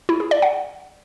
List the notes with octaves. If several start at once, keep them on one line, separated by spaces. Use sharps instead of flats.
E4
G#4
D5
F#5